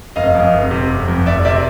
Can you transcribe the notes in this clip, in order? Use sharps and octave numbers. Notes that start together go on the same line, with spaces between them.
F1 D#5 F5
F2
F1
C3
F1
F2
F1 D5 E5
C3 D5 E5